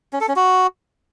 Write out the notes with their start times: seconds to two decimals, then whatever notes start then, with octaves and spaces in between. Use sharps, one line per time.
0.13 C#4
0.21 A4
0.28 C#4
0.36 F#4